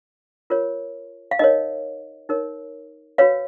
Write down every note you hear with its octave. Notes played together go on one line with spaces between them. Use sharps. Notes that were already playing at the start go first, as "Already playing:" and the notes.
F4 A#4 C#5
F5
D#4 A#4 C#5 D#5
D#4 A#4 C#5
F#4 B4 C#5 F5